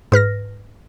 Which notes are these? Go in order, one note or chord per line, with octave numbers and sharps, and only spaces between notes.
G#2 B4 F6 A#6